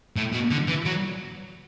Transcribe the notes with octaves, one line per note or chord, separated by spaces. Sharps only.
A2
B2
D3
E3
F#3